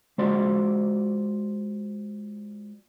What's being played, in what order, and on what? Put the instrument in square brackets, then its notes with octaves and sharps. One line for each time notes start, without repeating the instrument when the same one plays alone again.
[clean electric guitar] G#3 F4 F#4 C5 D5 C6